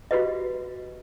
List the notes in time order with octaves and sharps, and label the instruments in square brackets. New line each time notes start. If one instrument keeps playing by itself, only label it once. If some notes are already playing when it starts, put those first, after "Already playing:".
[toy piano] F#4 G4 B4 D#5